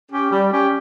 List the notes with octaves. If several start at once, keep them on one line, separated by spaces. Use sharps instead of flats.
C#4 G4
G3
C#4 G4